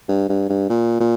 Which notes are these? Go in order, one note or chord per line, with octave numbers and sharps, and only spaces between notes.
G2
G2
G2
A#2
A#2